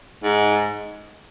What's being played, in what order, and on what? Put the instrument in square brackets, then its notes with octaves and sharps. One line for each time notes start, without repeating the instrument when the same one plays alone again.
[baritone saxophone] G#2